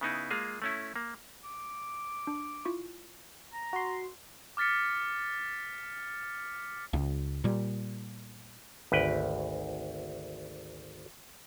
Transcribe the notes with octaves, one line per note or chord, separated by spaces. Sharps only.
C#3 B3 D#4 E4
G#3 A#3 F4 G#4
A3 C#4 E4
A#3
D6
D4
E4 F4 C#6
A#5
F#4 C6
D6 F6 A6 B6 C#7
C#2
A#2 G3
G#1 D2 B4 G5